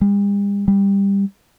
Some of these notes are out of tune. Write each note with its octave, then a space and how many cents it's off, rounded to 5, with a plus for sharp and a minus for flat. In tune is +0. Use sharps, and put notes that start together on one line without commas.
G3 +45
G3 +15